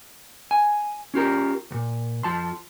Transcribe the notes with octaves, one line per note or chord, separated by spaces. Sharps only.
G#5
C#4 F4 G4 A#4
D2 A#2
F2 F3 A5 C6